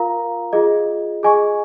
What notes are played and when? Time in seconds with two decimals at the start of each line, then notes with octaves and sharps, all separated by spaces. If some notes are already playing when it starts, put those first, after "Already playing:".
Already playing: F4 A#4 F5 A#5
0.53 F4 G#4 D#5
1.23 G#4 D#5 G#5 C#6